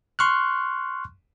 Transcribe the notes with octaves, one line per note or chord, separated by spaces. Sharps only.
C6 C#6 F6 F#6